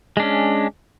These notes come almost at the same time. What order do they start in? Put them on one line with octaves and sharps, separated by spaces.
G#3 D4 C#4